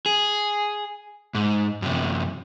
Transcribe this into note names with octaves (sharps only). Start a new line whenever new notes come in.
G#4
G#2
F#2 C3